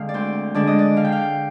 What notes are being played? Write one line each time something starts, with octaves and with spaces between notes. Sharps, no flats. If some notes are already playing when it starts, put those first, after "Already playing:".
Already playing: D3 G#3 C4 F5
D5
D2 C5
D3 G#3 D4 D5
D#5
D5
D3 F5
G5
F5